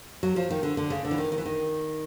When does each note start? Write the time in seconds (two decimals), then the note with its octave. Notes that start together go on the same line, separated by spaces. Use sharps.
0.23 F#3
0.36 F3
0.51 D#3
0.63 D3
0.77 D3
0.90 C#3
1.05 D3
1.11 E3
1.18 D#3
1.32 D#3
1.38 E3
1.46 D#3